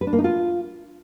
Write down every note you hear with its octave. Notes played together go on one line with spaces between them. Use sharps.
B4
D4
A#3
D#4
F4